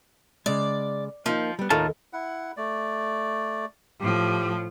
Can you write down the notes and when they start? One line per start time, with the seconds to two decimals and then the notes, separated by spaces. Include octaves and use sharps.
0.46 C#3 G#3 D5
1.26 F3 A#3 D#4
1.59 G3 B3
1.70 D#2 A2 D#4 F4 A#4 A5
2.13 E4 F#5
2.57 A3 D5
4.00 A2 F3 G4